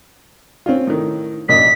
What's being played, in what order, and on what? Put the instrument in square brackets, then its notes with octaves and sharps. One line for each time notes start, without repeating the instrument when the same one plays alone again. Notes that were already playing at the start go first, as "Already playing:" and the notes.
[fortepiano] C4 C#4 F4
A2 D#3
[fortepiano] A#1 F#2 D#5 [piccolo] B6